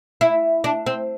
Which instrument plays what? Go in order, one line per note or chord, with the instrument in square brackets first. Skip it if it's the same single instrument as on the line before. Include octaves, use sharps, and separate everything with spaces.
[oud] E4
D4
C4